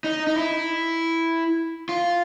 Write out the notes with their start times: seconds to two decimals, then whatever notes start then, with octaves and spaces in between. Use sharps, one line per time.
0.04 D#4
0.27 D#4
0.35 E4
1.89 F4